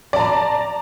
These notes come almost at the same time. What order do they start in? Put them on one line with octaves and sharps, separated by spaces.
D5 A5 A#5